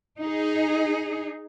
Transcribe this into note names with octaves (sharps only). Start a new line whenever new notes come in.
D#4 G#4